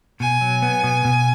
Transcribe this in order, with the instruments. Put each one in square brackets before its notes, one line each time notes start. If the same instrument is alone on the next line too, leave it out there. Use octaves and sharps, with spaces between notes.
[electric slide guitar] B2 [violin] G#5
[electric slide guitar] F#3
B3
B2
B2